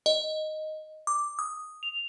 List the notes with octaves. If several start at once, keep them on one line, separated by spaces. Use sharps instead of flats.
D#5
D6
D#6
F7